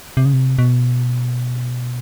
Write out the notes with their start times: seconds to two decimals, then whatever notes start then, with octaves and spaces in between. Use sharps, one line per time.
0.17 C3
0.25 C#3
0.33 C3
0.59 B2